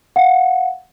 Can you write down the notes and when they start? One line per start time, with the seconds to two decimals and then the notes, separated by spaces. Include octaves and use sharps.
0.16 F5 F#5